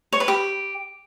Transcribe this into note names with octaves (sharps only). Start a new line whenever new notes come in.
C#5
B4
G4